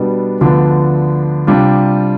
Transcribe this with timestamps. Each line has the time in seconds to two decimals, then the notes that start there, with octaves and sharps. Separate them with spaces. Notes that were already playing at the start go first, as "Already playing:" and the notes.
Already playing: B2 G3 B3 D4
0.41 D2 D3 F3 B3 D4
1.47 C3 G3 D4 F4